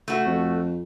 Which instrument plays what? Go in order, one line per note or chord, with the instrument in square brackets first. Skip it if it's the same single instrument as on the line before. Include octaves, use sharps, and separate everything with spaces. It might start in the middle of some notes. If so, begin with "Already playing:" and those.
[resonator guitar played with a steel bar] A3 F#4
[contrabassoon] F2